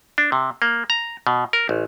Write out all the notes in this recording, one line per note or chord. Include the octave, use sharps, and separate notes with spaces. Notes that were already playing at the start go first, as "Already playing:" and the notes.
D4
C3
A#3
A#5
B2
A#4
A1